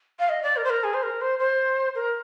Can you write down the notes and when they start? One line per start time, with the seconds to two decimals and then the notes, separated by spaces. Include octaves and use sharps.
0.19 F5
0.29 D#5
0.43 D5
0.56 A#4
0.64 C5
0.70 A#4
0.84 G#4
0.94 C5
1.03 A#4
1.21 C5
1.39 C5
1.95 A#4